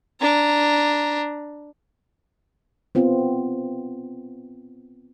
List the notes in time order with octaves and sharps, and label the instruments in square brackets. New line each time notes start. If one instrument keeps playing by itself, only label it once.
[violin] D4 A#5
[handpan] B3 C4 F4